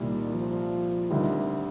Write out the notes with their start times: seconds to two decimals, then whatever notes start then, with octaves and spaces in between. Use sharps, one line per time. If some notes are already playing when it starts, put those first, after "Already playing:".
Already playing: C2 A#2 D#3 G3
0.34 F3
1.10 D2 C3 D#3 G3 C4